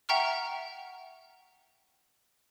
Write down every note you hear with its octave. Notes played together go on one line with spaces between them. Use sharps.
E5 F#5 G5 A#5 C#6 F6